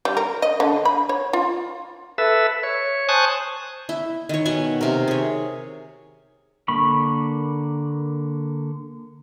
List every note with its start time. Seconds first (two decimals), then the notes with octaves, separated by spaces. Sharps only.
0.05 G3
0.17 A#4
0.42 D#5
0.60 D3
0.85 B5
1.09 C#5
1.33 F4
2.18 A4 B4 E5
2.63 C#5
3.09 C5 G#5 A5 C#6 D#6 F#6
3.89 E4
4.29 D#3 C#5
4.46 B2 F#5 G#5 C#6
4.81 C3 A#4
5.08 G#4 C#5
6.68 D3 A#3 B5 C#6